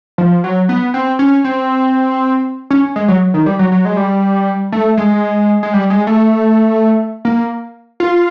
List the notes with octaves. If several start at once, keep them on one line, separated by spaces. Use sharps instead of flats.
F3
F#3
B3
C4
C#4
C4
C#4
G#3
F#3
D#3
G3
F#3
F#3
G#3
G3
A3
G#3
G#3
G3
G#3
A3
A#3
F4